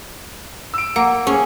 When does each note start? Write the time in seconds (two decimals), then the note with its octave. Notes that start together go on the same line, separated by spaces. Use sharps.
0.74 E6 D7
0.96 A#3 F#5
1.27 C#4 G#4